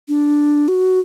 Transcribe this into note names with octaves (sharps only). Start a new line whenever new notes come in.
D4
F#4